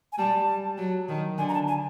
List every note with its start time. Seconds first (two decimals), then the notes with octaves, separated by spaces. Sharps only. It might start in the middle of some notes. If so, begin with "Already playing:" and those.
0.12 G#5
0.18 G3 A5
0.78 F#3
1.09 D#3
1.38 D3 G#5
1.48 A#5
1.54 A5
1.68 G#5